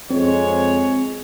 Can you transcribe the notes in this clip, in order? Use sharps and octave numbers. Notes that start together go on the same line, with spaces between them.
F2 G#3 C4 C#5